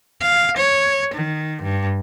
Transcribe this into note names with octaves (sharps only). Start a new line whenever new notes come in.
F5
C#5
D#3
G2